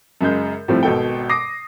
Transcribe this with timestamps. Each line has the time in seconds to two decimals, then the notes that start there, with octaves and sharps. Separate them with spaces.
0.21 F#2 C#3 G#3 G6
0.68 A2 C3 F3 G3 A3 C4
0.83 G#1 B2 A4 G5
1.29 D6 D#6 A#6 C7